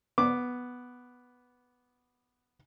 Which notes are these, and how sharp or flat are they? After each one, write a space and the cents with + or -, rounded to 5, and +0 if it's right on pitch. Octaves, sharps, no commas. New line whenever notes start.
B3 +0 D6 +0